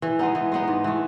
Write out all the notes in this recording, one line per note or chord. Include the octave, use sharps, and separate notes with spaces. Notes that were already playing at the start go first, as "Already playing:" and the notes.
E3
G#3 B3 D#4
E3
G#3 B3 D#4
G#2
E3 A3